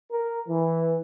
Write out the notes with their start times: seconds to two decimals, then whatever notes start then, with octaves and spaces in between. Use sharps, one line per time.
0.12 A#4
0.49 E3